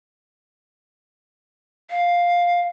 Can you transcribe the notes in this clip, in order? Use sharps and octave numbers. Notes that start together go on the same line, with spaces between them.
F5